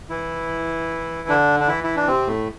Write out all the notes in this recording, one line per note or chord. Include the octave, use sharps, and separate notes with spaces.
E3 E4
D3 D4
D4
E3 E4
E4
D4
C3 C4
A2 A3